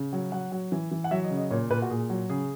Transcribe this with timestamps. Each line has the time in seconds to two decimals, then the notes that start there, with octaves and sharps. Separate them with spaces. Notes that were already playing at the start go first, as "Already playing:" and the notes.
Already playing: C#3
0.13 F#3
0.32 F#3 F#5
0.52 F#3
0.72 E3
0.91 E3
1.04 F#5
1.11 F#3 E5
1.24 D#5
1.31 C#3
1.37 D#5
1.51 A#2 C#5
1.70 A#2 B4
1.82 F#4
1.90 A#2 G#4
2.10 F#3
2.30 C#3 G#4